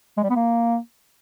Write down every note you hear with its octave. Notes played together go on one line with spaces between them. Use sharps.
G#3
G3
B3
A#3